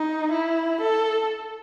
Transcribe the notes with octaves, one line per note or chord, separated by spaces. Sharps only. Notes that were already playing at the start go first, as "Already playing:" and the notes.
Already playing: D#4
E4
A4